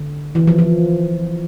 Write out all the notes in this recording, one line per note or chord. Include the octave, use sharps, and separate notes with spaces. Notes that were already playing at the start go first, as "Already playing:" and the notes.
Already playing: D3
E3
F3
F3